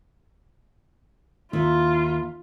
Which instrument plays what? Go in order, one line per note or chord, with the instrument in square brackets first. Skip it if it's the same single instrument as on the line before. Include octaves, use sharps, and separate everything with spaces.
[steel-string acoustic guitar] D#2 E4 E5 [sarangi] F4